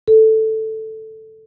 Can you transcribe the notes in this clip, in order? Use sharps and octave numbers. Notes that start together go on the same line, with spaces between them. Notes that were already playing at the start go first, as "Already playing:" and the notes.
A4